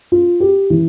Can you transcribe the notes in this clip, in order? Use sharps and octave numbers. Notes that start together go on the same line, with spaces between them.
F4
G4
E3